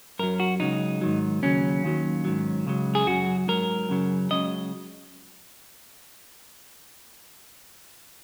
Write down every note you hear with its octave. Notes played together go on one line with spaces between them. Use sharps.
F#2 F#3 A#4
F#4
C#2 C#3 F#3 D#4
G#2 D#3 F#3
D#2 C#3 F#3 C#4
D#2 D#3 F#3
G#2 D#3 F#3
C#2 C#3 F#3
G#4
F#2 C#3 F#3 F#4
G#2 F#3 A#4
F#2 C#3 F#3
C#2 C#3 F#3 D#5